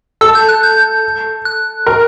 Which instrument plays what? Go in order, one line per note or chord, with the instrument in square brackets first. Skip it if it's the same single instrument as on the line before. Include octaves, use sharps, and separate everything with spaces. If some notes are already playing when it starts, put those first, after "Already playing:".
[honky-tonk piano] A4 [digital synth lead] E6
[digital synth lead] G6
F#6
G6
F#6
[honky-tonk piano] A#4